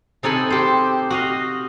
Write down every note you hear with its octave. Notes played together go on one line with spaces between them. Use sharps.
C3 D#4 A4 G#5 B5
G4 C5
F#4 D#5 F5